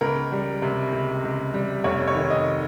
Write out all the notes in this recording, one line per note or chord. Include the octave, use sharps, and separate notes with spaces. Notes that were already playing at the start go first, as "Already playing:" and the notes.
C#2 A#4
G3
C3
C#2
C#2
G3
F1 C#5
C#5
D#3
D#5